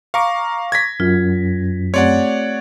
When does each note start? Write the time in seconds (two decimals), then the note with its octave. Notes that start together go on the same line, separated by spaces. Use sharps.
0.14 F5 A#5 C#6 D6
0.72 G#6 A#6 B6
1.00 F#2 F4
1.94 A3 C4 G4 C#5 D5 F#5